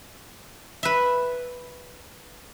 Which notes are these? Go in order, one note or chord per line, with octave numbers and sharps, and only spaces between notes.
B4 E5